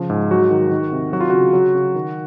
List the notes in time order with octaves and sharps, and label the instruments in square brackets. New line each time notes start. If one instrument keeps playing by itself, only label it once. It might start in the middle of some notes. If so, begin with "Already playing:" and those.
Already playing: [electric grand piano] C#3 F3
G#2
F#3 F#4
D#3
D#3
C3
F#3 F#4
F4
C#3 F#4
F#3
C#3
D#3